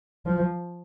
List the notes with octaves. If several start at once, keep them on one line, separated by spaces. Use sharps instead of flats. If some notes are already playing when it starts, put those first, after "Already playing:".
F3